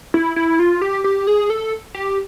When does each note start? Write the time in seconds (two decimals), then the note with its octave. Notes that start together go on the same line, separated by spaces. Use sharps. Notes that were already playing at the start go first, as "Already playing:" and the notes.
0.14 E4
0.36 E4
0.59 F4
0.82 G4
1.04 G4
1.27 G#4
1.50 A4
1.95 G4